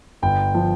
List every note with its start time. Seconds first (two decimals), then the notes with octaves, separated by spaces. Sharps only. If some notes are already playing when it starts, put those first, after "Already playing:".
0.22 G1 G5
0.55 F3